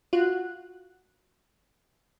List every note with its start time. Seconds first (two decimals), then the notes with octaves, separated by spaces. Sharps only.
0.13 F4 F#4 F#6